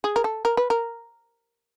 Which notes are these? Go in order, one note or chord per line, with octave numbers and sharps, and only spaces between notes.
G#4
A#4
A4
A#4
B4
A#4